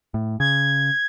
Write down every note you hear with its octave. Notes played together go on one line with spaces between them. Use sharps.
A2
C#3 G#6